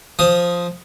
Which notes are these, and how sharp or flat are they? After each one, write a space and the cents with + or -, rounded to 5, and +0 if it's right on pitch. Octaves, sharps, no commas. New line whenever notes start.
F3 +0 D#6 +0